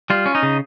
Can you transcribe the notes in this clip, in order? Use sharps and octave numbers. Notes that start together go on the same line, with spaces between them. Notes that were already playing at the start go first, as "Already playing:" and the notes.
G3 F4
C#4
D#4
C#3